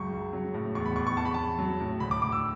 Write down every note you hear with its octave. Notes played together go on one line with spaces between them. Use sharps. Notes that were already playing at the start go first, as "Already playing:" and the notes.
Already playing: C#2 F#2 C#6
C#2
F#3
A2
E2 C#6
B5
E2 C#6
C#6
E2 A5
B5
E2 A5
F#3
A2
D2 B5
D6
D2 D6
E6